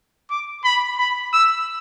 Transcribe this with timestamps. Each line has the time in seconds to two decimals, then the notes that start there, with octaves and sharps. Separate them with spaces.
0.30 D6
0.64 B5
0.98 B5
1.33 E6